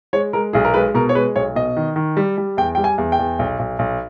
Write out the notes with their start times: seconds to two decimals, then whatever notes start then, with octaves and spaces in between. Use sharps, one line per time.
0.13 G#3 C#5
0.33 G#3 A#4
0.53 B1 G#4
0.65 A#4
0.74 G#3 B4
0.95 B2 A#4
1.09 C#5
1.15 G#3 B4
1.36 B1 C#5
1.55 B2 D#5
1.77 D#3
1.96 D#3
2.17 G3
2.38 G3
2.57 E2 G5
2.75 G3 G5
2.84 G#5
2.98 E2
3.12 G5
3.19 E2
3.39 B1
3.59 B1
3.79 B1